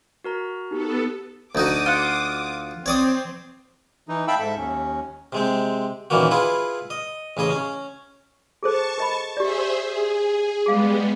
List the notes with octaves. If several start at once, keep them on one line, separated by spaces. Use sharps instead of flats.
F#4 A#4 A#5
B3 D#4 G4 A4
D2 D#4 F#4 D6 D#6
F4 F#5
C4 C#5 D5 D#6
E3 D#4
E5 F5 G5 A5 B5 E6
G#2 A4 E5
D#2 C#4
C3 G#3 C4
F#2 A#2 D#3 E3 A#3 F#4
E4 F4 G#4 B4
D#5
A1 C#3 G#4 D#5
C#4
G#4 A4 C5 A5 C#6
A#4 D#5 B5
G4 G#4 C5 D5 E5
G#4
G3 G#3 B3 G#4 F5